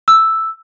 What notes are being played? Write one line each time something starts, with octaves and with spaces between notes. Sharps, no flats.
E6